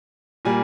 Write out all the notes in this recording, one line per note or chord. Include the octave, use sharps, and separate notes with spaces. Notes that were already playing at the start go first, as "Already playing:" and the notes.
A#2 G3 A#3 G#5